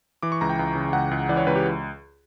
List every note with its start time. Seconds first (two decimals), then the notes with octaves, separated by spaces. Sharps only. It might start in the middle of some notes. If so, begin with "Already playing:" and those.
0.23 E3 D6
0.32 C#6
0.41 C#2 A#5
0.49 G5
0.59 C#2
0.75 C#3
0.93 C#2 F#5
1.11 C#2
1.29 E3 D5
1.37 C#5
1.47 C#2 B4
1.55 G4